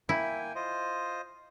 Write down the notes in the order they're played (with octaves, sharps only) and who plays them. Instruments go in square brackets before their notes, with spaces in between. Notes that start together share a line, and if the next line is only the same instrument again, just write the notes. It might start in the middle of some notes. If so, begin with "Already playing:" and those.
[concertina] A#3 G5 G#5 [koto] E4
[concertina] F4 C5 D#5